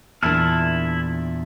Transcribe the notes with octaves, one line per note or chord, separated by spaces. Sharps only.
E2 A#2 D4 E4 A5 F6